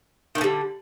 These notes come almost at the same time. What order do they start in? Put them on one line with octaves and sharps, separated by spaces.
D#3 A2 D3 G3